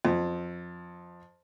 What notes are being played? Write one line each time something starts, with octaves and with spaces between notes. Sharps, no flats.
F2